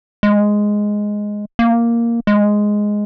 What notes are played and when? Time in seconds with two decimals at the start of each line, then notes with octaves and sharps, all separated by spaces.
0.23 G#3
1.59 A#3
2.27 G#3